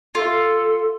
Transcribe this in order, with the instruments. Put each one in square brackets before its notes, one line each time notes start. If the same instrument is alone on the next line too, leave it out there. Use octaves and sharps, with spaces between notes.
[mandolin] F4 [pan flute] A4